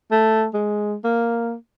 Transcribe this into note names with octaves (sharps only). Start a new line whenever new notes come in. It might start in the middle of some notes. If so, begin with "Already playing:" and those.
A3
G#3
A#3